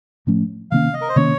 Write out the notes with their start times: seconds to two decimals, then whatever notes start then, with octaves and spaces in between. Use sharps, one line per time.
0.27 A2 F3 A3 C#4
0.71 C3 D#3 A#3 C#4 F5
0.94 D#5
1.01 A#4
1.09 C5
1.16 C3 D#3 A#3 C#4 C#5